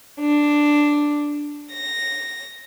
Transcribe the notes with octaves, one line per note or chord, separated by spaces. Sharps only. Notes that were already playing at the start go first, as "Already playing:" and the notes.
D4
A#6